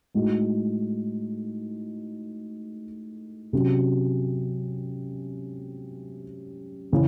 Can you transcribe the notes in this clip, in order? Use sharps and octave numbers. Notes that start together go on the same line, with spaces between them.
A2 G#3 D#4 F#4
C3 F#3 C#4
C#3 E3